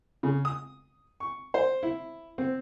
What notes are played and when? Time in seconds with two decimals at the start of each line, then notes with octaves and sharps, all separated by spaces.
0.23 C#3
0.45 D#6
1.20 C#6
1.54 C5
1.83 E4
2.38 C4